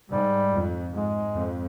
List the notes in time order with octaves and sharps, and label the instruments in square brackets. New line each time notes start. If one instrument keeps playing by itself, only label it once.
[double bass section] G#2 [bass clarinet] G3
[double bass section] F2
[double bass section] G#2 [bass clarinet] G#3
[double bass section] F2